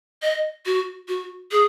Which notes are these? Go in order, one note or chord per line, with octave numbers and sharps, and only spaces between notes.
D#5
F#4
F#4
G#4